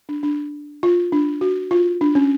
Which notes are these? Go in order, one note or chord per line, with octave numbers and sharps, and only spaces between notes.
D4
D4
F4
D4
F#4
F4
D4
C#4